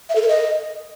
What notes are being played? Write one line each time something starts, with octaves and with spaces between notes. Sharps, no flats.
E5
A4
A#4
D#5